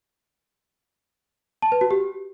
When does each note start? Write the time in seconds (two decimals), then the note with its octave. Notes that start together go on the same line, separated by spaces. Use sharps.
1.62 A5
1.72 B4
1.81 F#4
1.91 G4